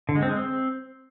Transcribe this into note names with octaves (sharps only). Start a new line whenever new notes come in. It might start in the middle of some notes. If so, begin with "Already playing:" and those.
D3
G#3
C4
G#3
C4